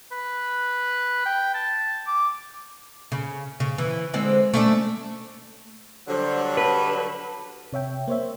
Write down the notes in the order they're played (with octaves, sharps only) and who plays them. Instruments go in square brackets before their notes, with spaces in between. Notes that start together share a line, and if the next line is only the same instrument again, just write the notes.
[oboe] B4
G5
A5
D6
[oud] C#3
C#3
E3
D3 G#3 C4
A3 C#4 D4
[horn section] D3 F#3 G3 [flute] C5
[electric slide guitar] B4 [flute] A5
[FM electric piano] C3 C#5 E5 G5
A#3 C5 C#5 E5